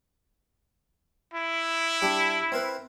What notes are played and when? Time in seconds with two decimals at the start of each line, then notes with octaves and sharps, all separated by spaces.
1.34 E4
2.02 G3 D4 G4
2.52 C4 A#4 B4